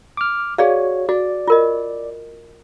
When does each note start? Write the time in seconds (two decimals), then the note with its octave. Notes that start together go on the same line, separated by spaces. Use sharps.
0.17 D6 F6
0.58 F#4 G#4 C#5 D5 F5
1.09 F#4 D5
1.48 F4 A#4 D#5